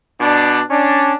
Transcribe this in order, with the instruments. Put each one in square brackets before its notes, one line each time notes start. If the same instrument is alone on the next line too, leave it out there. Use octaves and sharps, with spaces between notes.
[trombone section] B2 D4
C#4 D4